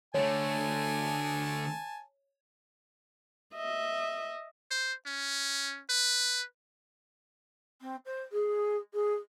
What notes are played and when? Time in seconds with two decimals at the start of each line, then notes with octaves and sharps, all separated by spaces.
0.14 D3 A3 C#5 G#5 A5
3.55 D#5 E5
4.71 C5
5.06 C#4
5.90 B4
7.81 C4
8.05 C5
8.32 G#4
8.94 G#4